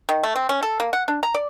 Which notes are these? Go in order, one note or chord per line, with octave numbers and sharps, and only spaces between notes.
D#3
A3
C4
C#4
A4
A#3
F#5
D4
A#5
D5